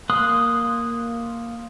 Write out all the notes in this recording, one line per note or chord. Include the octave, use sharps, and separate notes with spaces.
A#3 C6 D#6 F#6